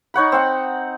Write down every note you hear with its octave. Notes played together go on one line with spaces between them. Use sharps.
D#4 C#5 F#5 B5
C4 F#5